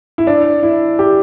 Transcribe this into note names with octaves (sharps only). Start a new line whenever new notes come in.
E4
D4
E4
G4